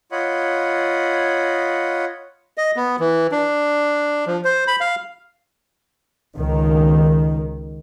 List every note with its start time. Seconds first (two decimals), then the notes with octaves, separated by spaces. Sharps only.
0.12 F4 C#5 D#5 F#5 B5
2.58 D#5
2.76 B3
3.00 E3
3.32 D4
4.27 F3
4.44 C5
4.68 B5
4.81 F5
6.35 C#2 D#3